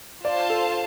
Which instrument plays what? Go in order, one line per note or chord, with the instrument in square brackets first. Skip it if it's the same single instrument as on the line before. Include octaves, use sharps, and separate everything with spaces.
[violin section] F4 C5 F5 A5 [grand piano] D5
[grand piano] A4